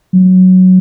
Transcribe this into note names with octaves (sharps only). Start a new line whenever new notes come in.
F#3